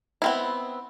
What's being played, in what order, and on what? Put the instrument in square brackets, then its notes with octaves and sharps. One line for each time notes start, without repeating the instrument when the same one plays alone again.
[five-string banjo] B3 C4 E4